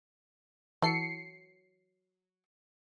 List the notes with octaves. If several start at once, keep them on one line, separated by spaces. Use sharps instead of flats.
E3 F#3 A4 C7 C#7